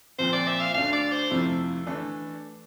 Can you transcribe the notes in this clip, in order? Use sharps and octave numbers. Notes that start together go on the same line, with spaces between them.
A#2 F3 C4 C5
D5
E5
F5
D2 D3 A3 D4 F5
D5
C5
F2 C3 F3 A3 E4
E3 A3 D4